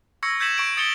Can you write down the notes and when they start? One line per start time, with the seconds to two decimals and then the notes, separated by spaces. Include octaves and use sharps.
0.23 C#6 E6 G#6 A#6 C#7
0.40 E6 G6 G#6 B6 E7 F#7
0.58 C#6 D7
0.77 D#6 A6 C#7 D7 F7 G7